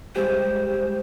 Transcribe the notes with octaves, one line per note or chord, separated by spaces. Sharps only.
G3 G#3 G4 C5